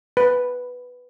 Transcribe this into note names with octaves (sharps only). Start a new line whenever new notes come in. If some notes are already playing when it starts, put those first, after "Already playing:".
B4